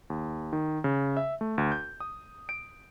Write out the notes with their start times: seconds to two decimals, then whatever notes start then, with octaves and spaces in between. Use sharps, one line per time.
0.10 D#2
0.53 D#3
0.84 C#3
1.17 E5
1.41 A3
1.58 D2
1.72 G6
2.00 D#6
2.49 D7